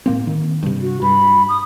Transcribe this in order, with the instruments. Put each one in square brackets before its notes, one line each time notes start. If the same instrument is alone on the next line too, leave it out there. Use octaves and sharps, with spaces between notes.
[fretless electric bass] A2 A#3 C4
D#3
G2 C3
[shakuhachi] F#4
[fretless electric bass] G2 [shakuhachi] B5
[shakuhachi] D#6